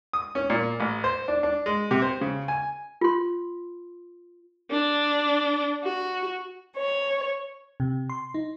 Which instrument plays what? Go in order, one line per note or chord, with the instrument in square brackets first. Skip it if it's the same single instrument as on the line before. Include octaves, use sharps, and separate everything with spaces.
[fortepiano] D#6
C#4
A#2
A1
C5
D4
D4
G#3
C3
C5
C#3
G#5
[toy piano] F4 C6
[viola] D4
F#4
[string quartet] C#5
[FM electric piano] C3
C6
D#4